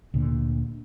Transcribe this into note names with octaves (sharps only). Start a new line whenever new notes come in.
D2 A#2 D3